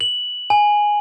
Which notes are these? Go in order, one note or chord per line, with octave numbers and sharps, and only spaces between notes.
F#7
G#5